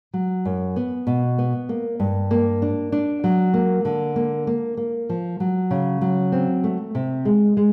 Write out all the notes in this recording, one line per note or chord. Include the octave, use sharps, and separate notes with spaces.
F#3
F#2
B3
B2
B3
A#3
G2
A#3
D4
D4
F#3
A#3
D3
A#3
A#3
A#3
F3
F#3
C#3
F#3
C4
A3
C3
G#3
G#3